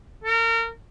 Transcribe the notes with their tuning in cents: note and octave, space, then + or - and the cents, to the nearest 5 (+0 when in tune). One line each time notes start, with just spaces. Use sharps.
A#4 -30